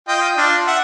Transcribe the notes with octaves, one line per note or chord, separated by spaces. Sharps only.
F4 D#5 G5
D4 F4
E5 F#5